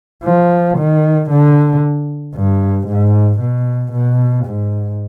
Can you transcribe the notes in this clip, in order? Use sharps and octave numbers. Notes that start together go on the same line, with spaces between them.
F3
D#3
D3
G2
G#2
B2
B2
G#2